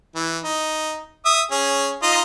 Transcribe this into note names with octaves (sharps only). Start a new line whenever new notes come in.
E3
D#4
E5 D#6
C#4 G#4
D#4 F4 D#5